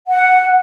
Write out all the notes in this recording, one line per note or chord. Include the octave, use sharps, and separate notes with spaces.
F#5